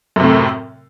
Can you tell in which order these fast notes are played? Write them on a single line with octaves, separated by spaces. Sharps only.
F#2 C3 A2